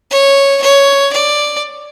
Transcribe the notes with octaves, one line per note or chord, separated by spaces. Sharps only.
C#5
C#5
D5